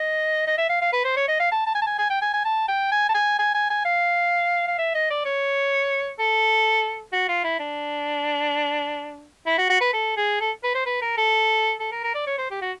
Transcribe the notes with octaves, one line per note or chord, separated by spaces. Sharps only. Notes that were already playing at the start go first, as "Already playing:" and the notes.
Already playing: D#5
D#5
E5
F5
F5
B4
C5
C#5
D#5
F5
A5
A5
G#5
A5
G#5
G#5
G5
G#5
G#5
A5
G5
G#5
A5
G#5
G#5
G#5
G#5
F5
F5
E5
D#5
D5
C#5
A4
F#4
F4
E4
D4
E4
F#4
F#4
B4
A4
G#4
A4
B4
C5
B4
A#4
A4
A4
A#4
A#4
D5
C#5
C5
G4
F#4